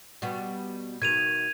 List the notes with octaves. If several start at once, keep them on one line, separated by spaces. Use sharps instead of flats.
B2 G3 B3
B2 D#3 G#6 D#7 F7